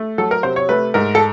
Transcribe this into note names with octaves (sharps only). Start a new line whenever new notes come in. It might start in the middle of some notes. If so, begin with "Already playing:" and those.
Already playing: A3
F#3 A4
A#4
C3 C5
C#5
A3 B4
G#2 A#4
A4